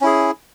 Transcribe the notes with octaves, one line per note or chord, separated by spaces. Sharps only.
C#4 E4 G#4